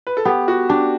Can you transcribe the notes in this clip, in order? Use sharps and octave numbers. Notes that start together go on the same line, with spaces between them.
B4
A4
B3 G4
F#4
D4 G4